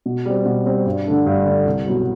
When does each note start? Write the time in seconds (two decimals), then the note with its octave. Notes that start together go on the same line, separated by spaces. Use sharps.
0.06 B2
0.26 G3 C4
0.45 B2
0.66 G3 C4
0.86 G2
1.06 D3 A3 D4
1.26 G2
1.45 D3 A3 D4
1.66 C2
1.86 B2 F#3 B3 F#4